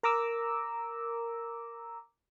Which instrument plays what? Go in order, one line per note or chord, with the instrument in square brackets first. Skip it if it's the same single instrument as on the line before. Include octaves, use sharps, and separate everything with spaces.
[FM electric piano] A#4 A#5 D6 E6